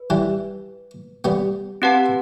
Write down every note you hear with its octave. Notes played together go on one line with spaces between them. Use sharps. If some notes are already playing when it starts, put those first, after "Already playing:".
Already playing: B4
E3 G3
G3 B3
C4 G4 B4 F#5 A5